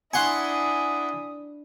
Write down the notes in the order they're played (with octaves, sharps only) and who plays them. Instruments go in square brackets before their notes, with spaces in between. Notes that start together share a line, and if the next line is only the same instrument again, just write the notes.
[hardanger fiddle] D4 E4 [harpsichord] F#5 C6 C#6 [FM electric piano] G#5 [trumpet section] D#6